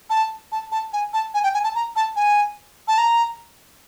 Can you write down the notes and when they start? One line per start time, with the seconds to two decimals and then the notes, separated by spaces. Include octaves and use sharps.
0.10 A5
0.52 A5
0.72 A5
0.93 G#5
1.13 A5
1.34 G#5
1.44 G5
1.54 G#5
1.64 A5
1.75 A#5
1.96 A5
2.16 G#5
2.88 A5
2.98 A#5